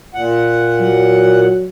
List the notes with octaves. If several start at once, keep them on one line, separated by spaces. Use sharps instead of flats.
A#2 F#5
F#3